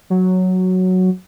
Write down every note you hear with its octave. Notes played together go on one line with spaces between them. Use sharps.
F#3